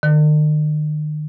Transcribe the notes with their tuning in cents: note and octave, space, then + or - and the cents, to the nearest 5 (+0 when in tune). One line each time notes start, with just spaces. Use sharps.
D#3 -40